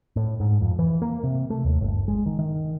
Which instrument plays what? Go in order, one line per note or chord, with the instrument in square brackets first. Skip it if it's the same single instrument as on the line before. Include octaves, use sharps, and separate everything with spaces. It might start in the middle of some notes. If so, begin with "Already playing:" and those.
[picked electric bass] A2
G#2
F2
E3
A#3
C3
A3
D#2
G1
G#3
D#3
D#3